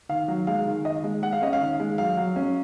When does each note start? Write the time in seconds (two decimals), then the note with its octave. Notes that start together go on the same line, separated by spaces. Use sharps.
0.09 D#3 F5
0.28 F#3
0.47 G#3 F5
0.66 D#3
0.85 D#3 D#5
1.04 G#3
1.22 G#3 F#5
1.33 F5
1.42 C#4 D#5
1.53 F5
1.61 D#3
1.80 G#3
1.98 F#3 F5
2.17 F#3
2.36 C#4